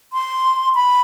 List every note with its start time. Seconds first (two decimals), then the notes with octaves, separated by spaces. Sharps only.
0.13 C6
0.75 B5